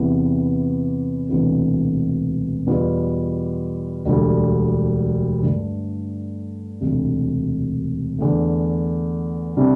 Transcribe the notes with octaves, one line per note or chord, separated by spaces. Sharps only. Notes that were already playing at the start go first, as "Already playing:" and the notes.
Already playing: E2 C3 E3 B3
E1 D2 C3 E3 B3
E2 B2 G3 B3 F4
E1 D2 D3 G3
G2 D3 A3
E1 D2 C3
E2 D3 A3
C3 G3 D4